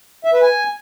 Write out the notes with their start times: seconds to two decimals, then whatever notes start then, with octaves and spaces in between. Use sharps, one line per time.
0.25 E5
0.33 B4
0.42 G#5